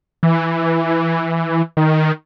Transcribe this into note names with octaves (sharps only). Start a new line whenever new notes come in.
E3
D#3